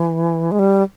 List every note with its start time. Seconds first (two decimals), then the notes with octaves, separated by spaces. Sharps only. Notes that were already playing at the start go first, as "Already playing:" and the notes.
Already playing: E3
0.52 G#3
0.59 G3